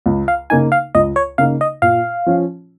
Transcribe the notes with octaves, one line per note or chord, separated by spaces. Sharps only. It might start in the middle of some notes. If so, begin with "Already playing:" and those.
C#2
F5
C#3 A#3 D#4 G#5
F5
C#2 D#5
C#5
C#3 A#3 D#4 F5
D#5
A#2 F5
F3 C#4